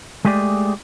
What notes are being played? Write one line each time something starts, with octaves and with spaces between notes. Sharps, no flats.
G#3 A3 G4 G#4 C#5 D5